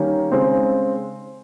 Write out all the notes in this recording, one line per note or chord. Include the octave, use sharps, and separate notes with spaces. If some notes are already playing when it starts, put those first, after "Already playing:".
Already playing: D#3 G3 A#3 C#4
C#3 G#3 C4